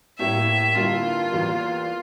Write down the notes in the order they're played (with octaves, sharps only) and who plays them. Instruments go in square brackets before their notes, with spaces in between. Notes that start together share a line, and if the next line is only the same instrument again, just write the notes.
[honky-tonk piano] A2 G3 A#3 E4 [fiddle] E5
[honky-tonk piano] G2 D3 G3 A#3 E4 [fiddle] F4
[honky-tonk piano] E2 E3 G3 A#3